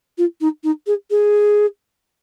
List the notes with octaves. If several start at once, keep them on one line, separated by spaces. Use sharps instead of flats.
F4
D#4
D#4
G#4
G#4